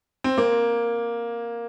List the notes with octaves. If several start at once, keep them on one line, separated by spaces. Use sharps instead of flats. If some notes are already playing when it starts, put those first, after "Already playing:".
C4
A#3